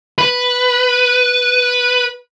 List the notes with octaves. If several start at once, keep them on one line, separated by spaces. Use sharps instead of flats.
B4